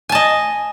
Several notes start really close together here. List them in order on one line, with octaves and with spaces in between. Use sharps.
G#5 A5 D#5